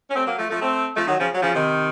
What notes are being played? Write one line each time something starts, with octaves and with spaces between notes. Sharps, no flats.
C#4
A3 C4
F#3 A#3
F3 A3
F3 A3
A3 C4
F3 A3
D#3 F#3
C#3 F3
F#3
C#3 F3
C3 D#3